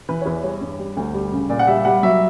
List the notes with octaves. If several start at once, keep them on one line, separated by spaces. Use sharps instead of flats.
E3 B4
C#5
E2 B4
G3 C#5
G2
G3
D2
G3
C#3
A#2 D5
F#5
G3 E5
G3 F#5
F#3 E5